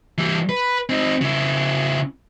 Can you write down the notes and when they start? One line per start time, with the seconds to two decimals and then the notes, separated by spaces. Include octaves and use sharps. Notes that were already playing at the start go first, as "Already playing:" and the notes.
0.18 E3 G3
0.49 B4
0.89 C4 D#4
1.22 C#3 E4